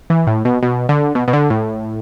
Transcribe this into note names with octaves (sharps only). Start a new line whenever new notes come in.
E3
A2
B2
B2
D3
B2
B2
D3
A2